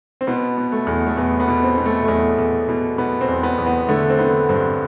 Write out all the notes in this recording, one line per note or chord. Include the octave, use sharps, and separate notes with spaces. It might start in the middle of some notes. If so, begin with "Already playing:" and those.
C4
B2 B3
B2
A3
E2
A3
E2 B3
B3
B2
C4
B2
A3
E2 A3
E2
B2
B2 B3
C4
E2
B3
E2
B3
D3 A3
C4
D3 B3
G2 C4